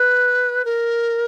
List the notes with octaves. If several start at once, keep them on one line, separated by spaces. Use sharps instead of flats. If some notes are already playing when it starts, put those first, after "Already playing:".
Already playing: B4
A#4